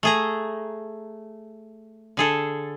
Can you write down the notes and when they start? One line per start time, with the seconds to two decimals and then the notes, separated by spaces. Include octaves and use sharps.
0.03 A3 G#4 A#5
2.17 D3 G#4 A4